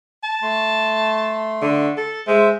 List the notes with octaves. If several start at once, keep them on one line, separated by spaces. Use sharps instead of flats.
A5
A3 C6
D3
A4
G#3 C5 E5